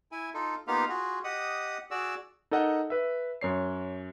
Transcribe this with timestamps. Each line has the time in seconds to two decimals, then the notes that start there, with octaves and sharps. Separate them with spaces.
0.12 E4 G#5
0.34 D#4 F4 A4
0.67 A#3 B3 D#4 F4 G4 F5
0.89 F4 F#4 G#4
1.24 G4 D#5 F#5 D#6
1.91 F#4 G#4 D5 E6
2.51 D#4 A4 A#4 D#5 F#5
2.90 B4 E5
3.41 F#2 C#5 C7